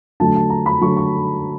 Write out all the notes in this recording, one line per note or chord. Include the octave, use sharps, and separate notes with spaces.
D3 F#3 A3 A5
A5
A#5
B5
D3 F#3 A3 C#6
C#6